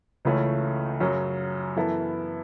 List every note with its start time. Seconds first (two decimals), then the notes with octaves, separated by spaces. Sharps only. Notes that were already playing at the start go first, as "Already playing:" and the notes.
0.25 C#2 C#3 E3 A3 C#4
1.00 F#2 C#3 F#3 C#4
1.76 F#2 E3 B3 E4 A4